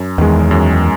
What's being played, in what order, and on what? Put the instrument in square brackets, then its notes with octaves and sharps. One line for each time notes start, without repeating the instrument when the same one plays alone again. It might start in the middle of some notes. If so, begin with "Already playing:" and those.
Already playing: [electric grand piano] F#2
[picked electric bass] E2 [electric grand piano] D#3 G#3
[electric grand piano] F#2